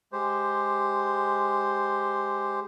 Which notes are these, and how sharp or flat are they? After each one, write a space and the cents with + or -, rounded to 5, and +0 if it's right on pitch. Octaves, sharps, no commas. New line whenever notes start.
G#3 +0 G4 +0 C5 +0